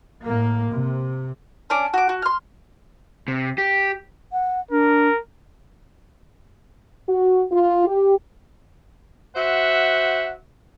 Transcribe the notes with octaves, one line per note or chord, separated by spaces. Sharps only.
A2 A#3
C3
C#4 D4 D6
F#4 D6
F#4
C6 F6
C3
G4
F#5
D4 A#4
F#4
F4
G4
F#4 C5 E5 F#5